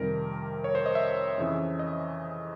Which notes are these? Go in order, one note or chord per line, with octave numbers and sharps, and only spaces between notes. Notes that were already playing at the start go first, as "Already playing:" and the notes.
Already playing: F2 C3 D#3 G3 A#4
C#5
C5
D#5
E5
F2 C#3 E3
D#5